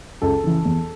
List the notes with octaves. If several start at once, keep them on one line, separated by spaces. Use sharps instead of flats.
C#2 A4
C#3 E3
E2